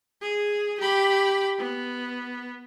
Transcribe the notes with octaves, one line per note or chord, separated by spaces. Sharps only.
G#4
G4 B5
B3